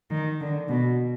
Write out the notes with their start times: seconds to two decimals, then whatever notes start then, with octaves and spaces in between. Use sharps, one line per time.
0.10 D#3
0.41 D3
0.69 B2